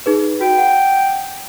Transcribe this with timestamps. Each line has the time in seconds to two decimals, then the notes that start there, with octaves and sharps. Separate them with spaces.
0.06 D#4 G#4 B4
0.41 F#4 G5
0.58 F#5